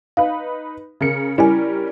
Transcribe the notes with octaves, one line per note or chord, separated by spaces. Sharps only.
D#4 B4 F5
C#3 A#4 C#7
G3 C#4 E4 A#4 G#5